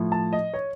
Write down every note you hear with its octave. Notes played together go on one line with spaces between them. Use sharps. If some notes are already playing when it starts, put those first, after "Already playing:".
Already playing: A2 F3
A5
D#5
C#5